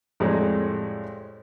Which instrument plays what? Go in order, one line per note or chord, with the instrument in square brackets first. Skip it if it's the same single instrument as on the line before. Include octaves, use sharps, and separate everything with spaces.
[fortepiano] F2 A2 G3 G#3